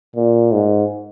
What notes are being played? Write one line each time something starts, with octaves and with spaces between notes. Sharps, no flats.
A#2
G#2